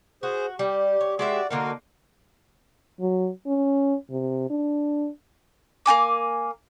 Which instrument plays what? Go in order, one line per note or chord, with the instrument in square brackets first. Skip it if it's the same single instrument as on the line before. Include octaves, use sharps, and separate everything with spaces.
[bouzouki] F#4 [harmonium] G#4 C5
[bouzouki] G3 [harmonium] G4
[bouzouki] C#5
[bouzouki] G#3 G4 E5 [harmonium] F#4 D5
[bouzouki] D3 A#3 D#4 [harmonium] F#4 A#4
[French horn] F#3
C#4
C3
D4
[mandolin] A#3 F4 G#5 D6